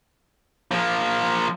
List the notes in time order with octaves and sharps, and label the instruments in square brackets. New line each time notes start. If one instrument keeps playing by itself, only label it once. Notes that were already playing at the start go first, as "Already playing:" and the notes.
[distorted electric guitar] F3 A#3